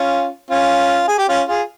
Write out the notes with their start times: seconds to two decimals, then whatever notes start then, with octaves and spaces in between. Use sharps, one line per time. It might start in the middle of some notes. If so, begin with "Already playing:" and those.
Already playing: C#4 F4
0.50 C#4 F4
1.08 G#4
1.18 G4
1.29 C#4 F4
1.48 F4 G#4